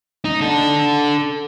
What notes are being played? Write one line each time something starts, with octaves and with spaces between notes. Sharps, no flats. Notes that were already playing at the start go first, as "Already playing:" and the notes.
D#4
D4 A4